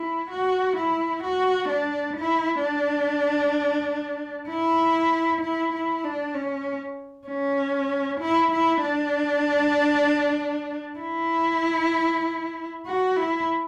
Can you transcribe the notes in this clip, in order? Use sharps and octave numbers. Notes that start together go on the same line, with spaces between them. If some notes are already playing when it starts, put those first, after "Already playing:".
Already playing: E4
F#4
E4
F#4
D4
E4
D4
E4
E4
E4
D4
C#4
C#4
E4
E4
D4
E4
F#4
E4